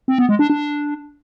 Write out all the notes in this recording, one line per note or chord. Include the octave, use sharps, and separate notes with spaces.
C4
B3
G#3
D4
D4